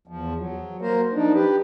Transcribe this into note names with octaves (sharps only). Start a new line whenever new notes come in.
E2 F3
F#3
A#3 A#4 C5
F3 D4 D#4
G4 B4